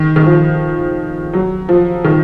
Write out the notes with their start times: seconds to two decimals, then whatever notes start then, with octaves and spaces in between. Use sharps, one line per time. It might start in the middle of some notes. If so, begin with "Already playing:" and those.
Already playing: D#3
0.16 D#3
0.26 F3
1.33 F#3
1.69 F3
2.05 D#3